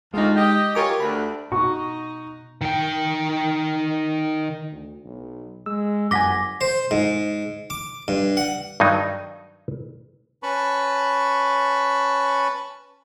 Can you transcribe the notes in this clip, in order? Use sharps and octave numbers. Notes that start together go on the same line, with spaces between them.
D2 G#3 D#4 F4
G4 D#5
F4 G4 G#4 A#4 C#5 D6
D2 B5
B2 D#4 F#4 C#6
D#3 G5
D2
B1
G#3 E6
G1 F#2 F#5 G#5 D6 A#6 B6
C5
G#2
D6
G2
F#5
G2 D#3 F#3 D#4
C#4 B4 A5 B5 C#6